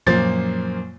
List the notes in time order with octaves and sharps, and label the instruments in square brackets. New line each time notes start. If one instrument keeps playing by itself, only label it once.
[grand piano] F#2 A#2 F3 A#3 C5 A6